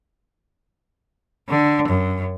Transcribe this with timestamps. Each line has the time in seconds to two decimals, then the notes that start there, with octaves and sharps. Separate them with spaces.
1.50 D3
1.88 F#2